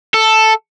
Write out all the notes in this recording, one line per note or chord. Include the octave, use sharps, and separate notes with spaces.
A4